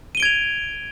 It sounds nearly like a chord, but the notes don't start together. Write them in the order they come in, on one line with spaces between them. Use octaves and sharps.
D#7 G7 D7 G#6 F7